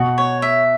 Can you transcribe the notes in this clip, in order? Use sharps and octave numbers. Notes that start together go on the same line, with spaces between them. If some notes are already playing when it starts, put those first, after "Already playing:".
Already playing: B2 F#4
C#5
E5